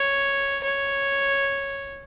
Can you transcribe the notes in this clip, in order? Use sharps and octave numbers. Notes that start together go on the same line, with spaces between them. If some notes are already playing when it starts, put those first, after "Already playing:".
Already playing: C#5
C#5